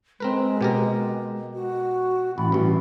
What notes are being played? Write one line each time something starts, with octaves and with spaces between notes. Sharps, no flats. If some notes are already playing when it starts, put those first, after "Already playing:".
G#3 C4 A#4 B4
B2 G4 A#4
F#4
A1 B5
A1 G2 F#4